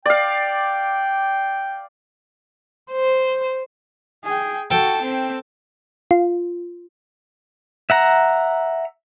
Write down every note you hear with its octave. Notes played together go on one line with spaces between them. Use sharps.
D5 F5 G5
C5
G#4 G5
F#4 A4 G5 A5
C4
F4
E5 F#5 A#5